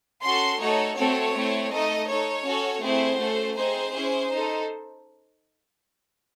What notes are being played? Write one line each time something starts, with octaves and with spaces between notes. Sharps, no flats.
C#4 F#4 A4 C6
A3 D#4 F#4 A4 C#5
A3 C4 F#4 A4 C#5
A3 C4 E4
A3 D#4 A4 D#5
D#4 A4 C#5
C#4 F#4 A4
A3 C4 E4 G#4 C5
A3 C#4 F#4 A4
C4 D#4 G#4 C5
C#4 E4 G#4
D#4
A4